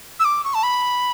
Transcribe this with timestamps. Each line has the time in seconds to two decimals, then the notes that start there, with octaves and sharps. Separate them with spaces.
0.19 E6
0.25 D6
0.44 C#6
0.54 A5
0.63 B5